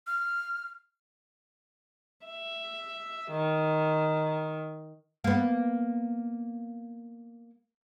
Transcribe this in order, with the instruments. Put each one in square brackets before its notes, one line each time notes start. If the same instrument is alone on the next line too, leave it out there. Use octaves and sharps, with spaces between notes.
[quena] F6
[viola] E5
D#3
[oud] A#3 B3